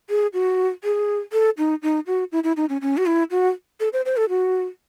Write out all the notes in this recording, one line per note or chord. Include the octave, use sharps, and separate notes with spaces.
G#4
F#4
G#4
A4
D#4
D#4
F#4
E4
E4
D#4
C#4
C#4
F#4
E4
F#4
A4
C5
C5
A4
F#4